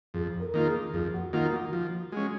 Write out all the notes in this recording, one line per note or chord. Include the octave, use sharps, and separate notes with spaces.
F2 G#4
A#4
D#3 A#3 F4
G#4
F2 G#4
F#4
D#3 A#3 F4 F#4
F#4
F3 F#4
G#3 C#4 F#4